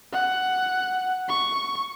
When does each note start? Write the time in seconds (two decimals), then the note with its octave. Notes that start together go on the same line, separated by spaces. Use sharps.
0.13 F#5
1.29 C#6